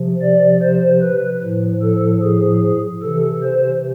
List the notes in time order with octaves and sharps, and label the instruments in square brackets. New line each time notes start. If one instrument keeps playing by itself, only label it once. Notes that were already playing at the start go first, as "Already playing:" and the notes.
Already playing: [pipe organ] C3 F3
D5
C5
B4
A2 F3
A4
G#4
C3 E3 A4
C5